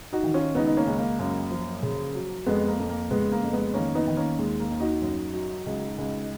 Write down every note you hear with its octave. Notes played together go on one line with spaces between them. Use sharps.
D#4 F#4
D#3
C#4 F4
C#2 B3 D#4
D#4
A#3 C#4
C#2
A#3
F#2 A#3
F3
C#3
F#3
F2 G#3 B3
A#3
F2
A#3
C#3 G#3 B3
A#3
F2
G#3 B3
D#3 A#3 C#4
B3 D#4
D#3
A#3 C#4
D#2 G#3
A#3
D#2
D#4 F#4
F#2
F#3
C#2
C#2